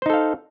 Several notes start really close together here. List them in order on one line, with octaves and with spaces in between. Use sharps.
C5 D#4 A4 F5